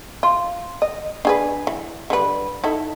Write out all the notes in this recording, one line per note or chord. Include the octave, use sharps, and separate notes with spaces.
F4
D#5
D4 G#4 B4
E3
D3 G3 B4
D#4 E4 A4